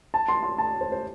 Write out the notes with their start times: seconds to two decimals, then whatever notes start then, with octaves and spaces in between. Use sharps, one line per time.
0.14 A5
0.28 C6
0.43 C6
0.58 A5
0.81 C5
0.92 C5